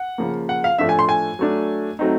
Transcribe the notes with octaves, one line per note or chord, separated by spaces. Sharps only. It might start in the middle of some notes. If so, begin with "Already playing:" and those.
Already playing: F#5
C#3 F3 A#3
F#5
F5
A2 F3 A3 D4 E5
G#5
C6
G#5
F#3 A3 D4
F#3 A3 C4 D#4